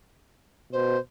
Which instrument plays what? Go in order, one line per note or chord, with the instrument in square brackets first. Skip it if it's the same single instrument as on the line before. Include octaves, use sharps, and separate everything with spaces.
[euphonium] B2 [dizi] C5